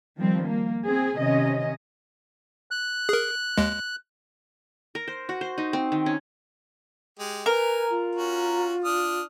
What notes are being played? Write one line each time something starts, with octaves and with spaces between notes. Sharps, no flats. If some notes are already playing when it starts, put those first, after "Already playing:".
D#3 F3 G3 C4
A#3
C4 G#4
C3 D#3 C#4 D#5
F#6
G#4 A#4
D#2 G#3
A#4
C5
F#4
C5
D#4
C4
D#3
C#4
G#3 G4
A#4 B4 G#5
F4
C#4 F#4
D4 D#6 F6